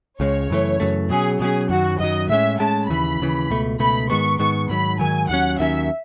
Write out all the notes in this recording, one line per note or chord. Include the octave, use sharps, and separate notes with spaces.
C#2 C#3 G#3 C#5
F#2 C#3 E3 A3
F#2 C#3 E3 A3
B2 F#3 C#4 G#4
B2 F#3 C#4 G#4
F#2 D#3 F#3 F#4
F#2 D#3 F#3 D#5
A2 G#3 C#4 E5
A2 G#3 C#4 A5
D#2 C#3 E3 B5
D#2 C#3 E3
C#2 B2 A3
C#2 B2 A3 B5
G#2 D#3 G#3 B3 C#6
G#2 D#3 G#3 B3 C#6
G#2 D#3 F#3 B5
G#2 D#3 F#3 G#5
D#2 D#3 F#3 C#4 F#5
D#2 D#3 F#3 C#4 E5